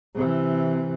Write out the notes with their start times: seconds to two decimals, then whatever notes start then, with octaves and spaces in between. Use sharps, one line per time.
0.14 C3 E3